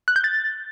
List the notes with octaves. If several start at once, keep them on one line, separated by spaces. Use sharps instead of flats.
F#6
G6
A6